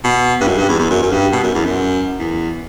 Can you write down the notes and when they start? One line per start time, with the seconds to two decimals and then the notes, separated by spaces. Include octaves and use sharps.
0.04 B2
0.41 G2
0.47 F#2
0.58 G2
0.69 E2
0.79 E2
0.91 F#2
1.03 F#2
1.12 G2
1.33 B2
1.43 F#2
1.55 E2
1.65 F#2
2.19 E2